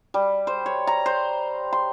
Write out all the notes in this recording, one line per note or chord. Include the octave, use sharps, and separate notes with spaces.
G3
C5
C#5
A#5
C5
C6